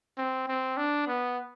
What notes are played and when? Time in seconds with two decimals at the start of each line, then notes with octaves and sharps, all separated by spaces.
0.18 C4
0.48 C4
0.77 D4
1.07 B3